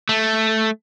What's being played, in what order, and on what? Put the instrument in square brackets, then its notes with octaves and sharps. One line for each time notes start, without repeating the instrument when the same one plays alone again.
[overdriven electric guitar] A3